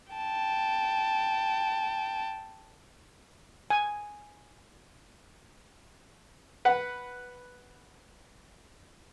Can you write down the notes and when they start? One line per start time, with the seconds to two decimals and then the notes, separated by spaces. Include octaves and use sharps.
0.13 G5 A5
3.70 G#5
6.65 B4 F#5